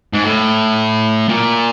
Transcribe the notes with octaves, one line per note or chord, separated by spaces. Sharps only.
G#2
A2
A#2